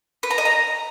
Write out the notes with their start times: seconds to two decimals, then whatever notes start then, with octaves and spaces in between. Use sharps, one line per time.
0.23 B4
0.30 A#5
0.38 D#5
0.45 A#5